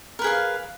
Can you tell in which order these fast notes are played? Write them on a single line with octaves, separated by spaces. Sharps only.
A#4 B4 G#4 F5